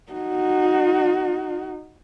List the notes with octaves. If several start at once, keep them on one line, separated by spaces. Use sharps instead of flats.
D#4 F#4